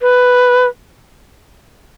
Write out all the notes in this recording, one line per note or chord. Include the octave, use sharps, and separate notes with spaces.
B4